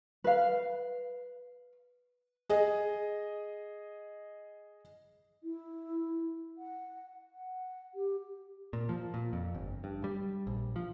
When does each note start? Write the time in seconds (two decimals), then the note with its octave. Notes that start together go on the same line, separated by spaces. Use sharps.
0.24 B4 F5
2.49 G#4 D#5
5.43 E4
6.58 F#5
7.32 F#5
7.95 G4
8.73 A#2
8.89 F3
9.14 A#2
9.33 F2
9.55 G1
9.84 G2
10.04 G3
10.47 A#1
10.76 F3